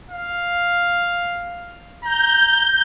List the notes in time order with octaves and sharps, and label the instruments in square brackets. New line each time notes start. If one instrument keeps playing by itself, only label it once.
[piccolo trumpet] F5
[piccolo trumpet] A#5 [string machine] G6